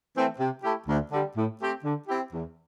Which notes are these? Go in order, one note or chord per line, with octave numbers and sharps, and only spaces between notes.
E3 A3 C4
C3
A3 E4 G4
D2
D3 G3
A2
A3 C4 G4
D3
C4 E4 G4
E2